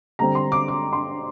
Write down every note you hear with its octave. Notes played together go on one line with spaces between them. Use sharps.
D3 G3 C4 A#5
C6
D6
D6
C6